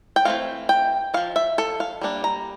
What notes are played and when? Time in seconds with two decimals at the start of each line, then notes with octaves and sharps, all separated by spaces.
0.16 G5
0.25 E3 A3 C4 F5
0.69 G5
1.14 F3 C4 F5
1.36 E5
1.58 A4
1.80 F5
2.01 G3 A#3 D4
2.24 A#5